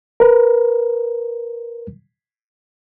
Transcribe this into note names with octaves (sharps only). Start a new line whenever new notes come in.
A#4 B4